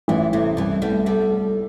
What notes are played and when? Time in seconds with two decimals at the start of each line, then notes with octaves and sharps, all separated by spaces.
0.08 A1 E3 G3
0.33 A2 C3 E3
0.57 C2 E3 G3
0.82 G3 A3 B3
1.06 G3 B3 A4
1.32 A4